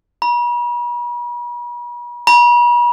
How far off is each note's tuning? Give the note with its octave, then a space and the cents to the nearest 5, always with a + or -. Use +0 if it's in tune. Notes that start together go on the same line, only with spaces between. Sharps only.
B5 -45
B5 -45